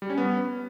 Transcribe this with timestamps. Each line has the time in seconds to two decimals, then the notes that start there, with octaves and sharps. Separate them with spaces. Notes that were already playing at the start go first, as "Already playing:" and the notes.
0.02 G3
0.10 C#4
0.17 B3